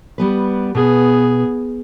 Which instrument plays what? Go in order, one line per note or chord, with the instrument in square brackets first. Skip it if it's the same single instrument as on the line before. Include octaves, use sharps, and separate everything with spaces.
[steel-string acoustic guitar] G3 B3 B4
[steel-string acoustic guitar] B2 [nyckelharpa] B3 G#4